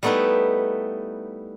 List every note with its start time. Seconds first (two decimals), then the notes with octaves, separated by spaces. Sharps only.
0.03 G3 A3 B3 D#4 E4 B4